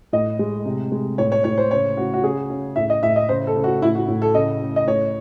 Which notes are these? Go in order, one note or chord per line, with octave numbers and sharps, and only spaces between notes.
A2 D#5
G#3
C3
G#3
A2 C#5
C#5
A2 C#5
C5
C#3 C#5
C#3 F#4
F#4
C#3 G#4
C#3
A2 E5
D#5
A2 E5
D#5
C#3 C5
A4
C#3
F#4
A2 E4
F#4
A2
A4
C#3 D#5
C#3
D#5
A2 C#5